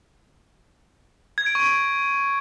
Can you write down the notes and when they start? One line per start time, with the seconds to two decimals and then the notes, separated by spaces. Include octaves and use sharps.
1.38 G#6
1.46 D7
1.55 C#6